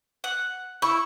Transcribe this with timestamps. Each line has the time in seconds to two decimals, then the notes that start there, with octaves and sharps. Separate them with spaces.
0.24 F#5
0.82 E4 C#6